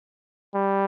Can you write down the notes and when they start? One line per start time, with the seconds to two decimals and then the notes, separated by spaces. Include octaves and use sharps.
0.54 G3